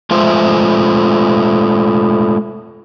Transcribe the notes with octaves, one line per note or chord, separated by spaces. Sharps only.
G#3 A3 F4 C5 E5